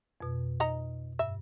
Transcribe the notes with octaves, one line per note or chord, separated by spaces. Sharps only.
F2 B2
D#4 D#5 A#5
G2 E5